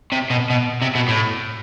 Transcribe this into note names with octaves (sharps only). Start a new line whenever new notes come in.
C3
B2
B2
C3
B2
A2